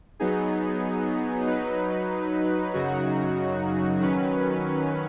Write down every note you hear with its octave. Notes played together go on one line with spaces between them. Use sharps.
F#3 B3 D#4 G#4
F#3 D#4 B4
F#2 C#3 F#3 D#4 F#4
D#3 F#3 C#4 B4